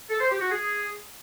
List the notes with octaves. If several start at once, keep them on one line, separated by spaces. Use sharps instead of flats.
A4
C5
G4
F#4
G#4